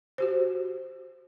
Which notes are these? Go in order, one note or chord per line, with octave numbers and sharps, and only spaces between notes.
F#4 G4 C5